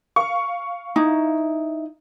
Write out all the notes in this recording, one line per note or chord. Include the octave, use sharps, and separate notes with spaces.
F5 C#6
D#4 E4